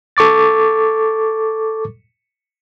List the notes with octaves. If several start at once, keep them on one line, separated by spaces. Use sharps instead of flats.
A4 C#6 D6 A6